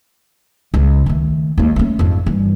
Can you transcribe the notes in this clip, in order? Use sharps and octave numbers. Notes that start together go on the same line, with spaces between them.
C#2
D#3 A3
D#2 G#3
A3 C#4
F2 G#2
G2 E3